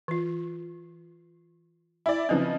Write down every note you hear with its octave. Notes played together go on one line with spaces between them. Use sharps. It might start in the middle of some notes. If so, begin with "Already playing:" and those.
E3 F4
E4 D5
C#3 F3 C4 D#4 B4